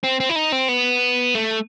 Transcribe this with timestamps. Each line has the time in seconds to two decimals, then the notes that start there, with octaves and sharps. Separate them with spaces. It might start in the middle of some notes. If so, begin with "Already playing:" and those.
0.04 C4
0.20 C4
0.30 E4
0.36 D#4
0.52 C4
0.68 B3
1.35 A3